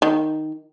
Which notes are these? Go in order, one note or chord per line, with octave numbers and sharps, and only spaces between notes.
D#3